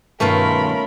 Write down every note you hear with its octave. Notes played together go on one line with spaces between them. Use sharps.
G2 B2 D#3 A3 C#4 F4 A#4 B5